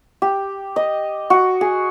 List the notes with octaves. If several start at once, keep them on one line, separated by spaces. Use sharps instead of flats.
G4
D#5
F#4
G#4